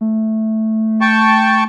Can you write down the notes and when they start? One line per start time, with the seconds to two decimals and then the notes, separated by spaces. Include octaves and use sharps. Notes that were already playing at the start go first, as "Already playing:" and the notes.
0.01 A3
1.01 G5 A5 C#6